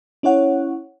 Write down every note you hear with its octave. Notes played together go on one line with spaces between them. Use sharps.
C#4 E4 C#5 F#5